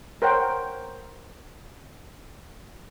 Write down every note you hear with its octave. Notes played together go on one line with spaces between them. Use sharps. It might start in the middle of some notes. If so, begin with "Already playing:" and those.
A#4 C5 C#5 F#5 G5